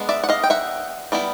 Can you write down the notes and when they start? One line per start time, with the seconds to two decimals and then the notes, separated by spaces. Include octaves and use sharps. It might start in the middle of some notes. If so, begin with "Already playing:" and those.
Already playing: G#3 B3 D4
0.09 D5 E5
0.24 F#5
0.29 D#5 F5
0.44 G5
0.50 E5 F#5
1.12 G3 B3 E4